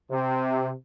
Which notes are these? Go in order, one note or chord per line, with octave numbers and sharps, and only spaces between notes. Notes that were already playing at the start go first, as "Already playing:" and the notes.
C3